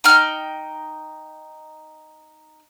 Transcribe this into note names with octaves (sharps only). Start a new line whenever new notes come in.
D#4 G5 F6